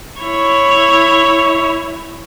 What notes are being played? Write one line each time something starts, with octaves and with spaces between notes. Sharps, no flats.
E4 C#5